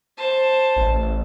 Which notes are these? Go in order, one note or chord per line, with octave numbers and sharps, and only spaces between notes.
C5 A5
A1